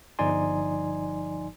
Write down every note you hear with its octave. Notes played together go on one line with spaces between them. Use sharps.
G1 F3 D#4 D5 G#5 C6